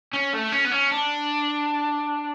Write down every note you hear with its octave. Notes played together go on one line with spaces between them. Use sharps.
C#4
A3
C#4
B3
C#4
D4